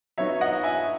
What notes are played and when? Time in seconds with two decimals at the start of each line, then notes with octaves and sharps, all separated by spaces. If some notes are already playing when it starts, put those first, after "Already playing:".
0.18 F#3 B3 D#4 C#5 E5
0.41 D#5 F#5
0.63 E5 G#5